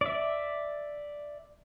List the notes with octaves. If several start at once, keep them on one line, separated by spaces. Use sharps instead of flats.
D5 E5